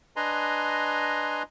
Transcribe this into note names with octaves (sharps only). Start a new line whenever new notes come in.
D4 B4 D#5 G#5 A#5 C6